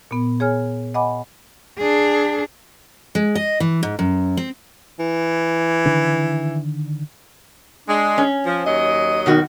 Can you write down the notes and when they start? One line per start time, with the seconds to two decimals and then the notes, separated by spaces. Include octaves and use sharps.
0.11 A#2 B3
0.40 G#4 C#5 G#5 F6
0.94 D#5 F#5 G#5 B5 D6
1.79 D4 G#4
3.15 G#3
3.35 D#5
3.60 E3
3.83 G#2
3.99 F#2
4.37 C4
4.99 E3
5.86 D3 D#3 D4
7.88 G#3 D4
8.18 C#4
8.46 F3
8.66 D#2 F#3 D#5
9.26 B2 D#3 F#4